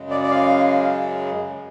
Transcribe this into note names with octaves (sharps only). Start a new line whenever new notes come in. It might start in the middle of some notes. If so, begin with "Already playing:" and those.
Already playing: F#2 C#3 G#3
D5
D5
F5